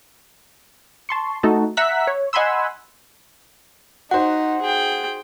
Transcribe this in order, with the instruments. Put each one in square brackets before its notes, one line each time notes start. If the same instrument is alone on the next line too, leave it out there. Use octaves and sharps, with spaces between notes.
[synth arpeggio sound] A5 C6 C#6
A3 D#4 F#4 A4
E5 F#5 A#5 E6 F#6 B6
C#5
D#5 F#5 G#5 B5 C6 E6
[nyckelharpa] D#4 [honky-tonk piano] F#4 C5 [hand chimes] F#5
[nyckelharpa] G#4 G5